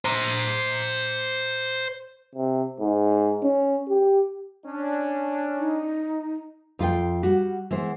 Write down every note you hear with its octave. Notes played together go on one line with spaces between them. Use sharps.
C5 A#5
C3
G#2
C#4
G4
C#4 D4
D#4
F2 F4 A4 G5
G3 F#4
E3 G#3 B3 C5